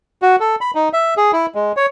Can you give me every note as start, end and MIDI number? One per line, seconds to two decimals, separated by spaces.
0.22 0.36 66
0.40 0.56 69
0.61 0.71 83
0.75 0.89 63
0.93 1.14 76
1.17 1.31 68
1.33 1.46 64
1.55 1.72 56
1.77 1.86 73